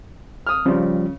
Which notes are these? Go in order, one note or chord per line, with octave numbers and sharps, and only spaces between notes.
D#6 F6
C#3 F3 G3 F4